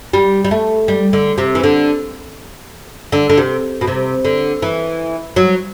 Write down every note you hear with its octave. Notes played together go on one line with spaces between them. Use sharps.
G3
G3
A3
G3
D3
C3
E3
D3
D3
D3
C3
B2
C3
D3
E3
F#3